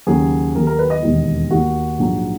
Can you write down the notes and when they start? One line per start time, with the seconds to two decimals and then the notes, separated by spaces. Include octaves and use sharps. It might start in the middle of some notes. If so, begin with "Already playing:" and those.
0.07 D#2 C#3 F#3 G#4
0.55 D#2 D#3 F#3 A#3 A#4
0.67 A#4
0.79 B4
0.90 D#5
1.03 E1 D#2 D#3
1.51 D#2 D#3 A#3 F#4
1.99 A#1 G#2 F#3